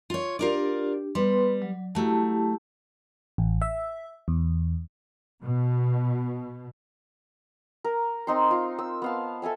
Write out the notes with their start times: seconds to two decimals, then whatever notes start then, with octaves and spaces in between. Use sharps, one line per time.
0.10 F4 C#5
0.39 D4 F4 G4 A#4 D5
1.15 G3 B3 B4 C6
1.62 F#3
1.95 F#3 A3 E4 G4 A5
3.38 A1
3.62 E5
4.28 E2
5.44 B2
7.84 A#4
8.27 C4 D#4 C6
8.51 F4
8.79 E6
9.02 B3 F5 A5
9.42 A4 E5 G#5 E6